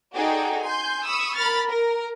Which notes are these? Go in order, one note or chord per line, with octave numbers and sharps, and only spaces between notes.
D#4 F#4 G#4 A4 D5 G5
G#5 C6 G6
B5 C#6 D#6 E6
A#4 B5 F6 A6
A#4